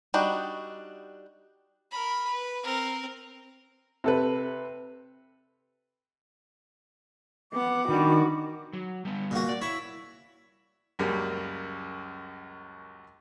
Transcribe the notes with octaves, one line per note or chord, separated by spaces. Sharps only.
G3 D4 D#4 F#4
A#4 B5
B4
C4 A#4
C3 A4 B4
B3 F#5 D6
D#3 G3 D4 F#4
F#3
G3 B3
A#2 F#4
D5
E4 C#5
C#2 F#2 G3 A#3